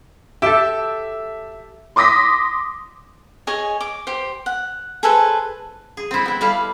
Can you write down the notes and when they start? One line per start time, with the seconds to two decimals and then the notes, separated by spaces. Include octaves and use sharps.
0.42 G4 A4 E5
1.96 C6 D6 D#6 A#6 B6
3.47 G#4 C#5 D#5 G#5
3.80 D6
4.07 G4 C5
4.46 F#5
5.03 G#4 A4 B4 C5
5.97 G#4
6.11 C4 E4
6.25 B3 E4
6.41 G3 E4 A4 F5